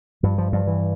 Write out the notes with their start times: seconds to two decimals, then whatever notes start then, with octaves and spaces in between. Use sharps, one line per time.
0.23 G2 F3
0.38 F3
0.52 G2 F3
0.67 E3